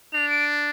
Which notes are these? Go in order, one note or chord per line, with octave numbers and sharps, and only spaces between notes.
D4 F7
D7